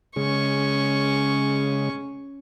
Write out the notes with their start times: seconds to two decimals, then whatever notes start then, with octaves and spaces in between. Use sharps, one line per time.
0.16 C#3 G#3 C#4 C#6